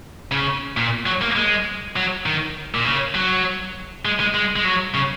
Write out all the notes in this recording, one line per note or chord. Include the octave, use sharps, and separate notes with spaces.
C#3
A#2
F#3
A#3
G#3
F#3
D#3
A#2
C#3
F#3
G#3
G#3
G#3
G#3
F#3
C#3